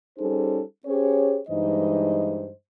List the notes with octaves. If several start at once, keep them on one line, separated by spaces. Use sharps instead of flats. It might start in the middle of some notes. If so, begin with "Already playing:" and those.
G3 C#4 D#4 G#4 A4 C5
C#4 G4 G#4 C5 C#5
G2 E3 G#3 D#4 C5 D#5